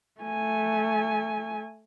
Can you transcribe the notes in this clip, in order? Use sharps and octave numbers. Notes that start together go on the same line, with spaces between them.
A3 G#5